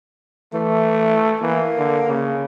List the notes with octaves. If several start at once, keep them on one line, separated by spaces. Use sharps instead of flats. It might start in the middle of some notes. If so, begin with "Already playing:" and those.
E3 A3
E3 A#3
D3
C#3